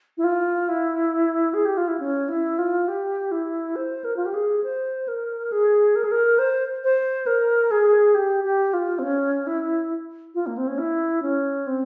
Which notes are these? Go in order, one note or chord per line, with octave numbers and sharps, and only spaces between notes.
E4
F4
E4
G#4
G4
F4
E4
C#4
E4
F4
G4
E4
C5
A#4
F4
G4
G#4
C5
A#4
G#4
A#4
G#4
A#4
C5
C5
A#4
G#4
G4
G4
F4
C4
C#4
E4
F4
A#3
C4
C#4
E4
C#4
C4